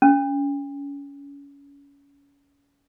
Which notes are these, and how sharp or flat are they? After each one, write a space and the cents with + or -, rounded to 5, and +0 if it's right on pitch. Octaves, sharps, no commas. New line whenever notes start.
C#4 +30